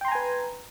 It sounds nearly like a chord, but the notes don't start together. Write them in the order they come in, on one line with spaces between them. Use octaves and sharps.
G5 C6 A#5 G#5 B4